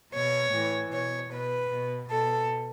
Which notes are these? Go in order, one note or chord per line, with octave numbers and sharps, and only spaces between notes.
B2 C#5
A2 E3
B2 C#5
B2 B4
B2
B2 A4